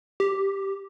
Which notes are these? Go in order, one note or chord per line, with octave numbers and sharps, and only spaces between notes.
G4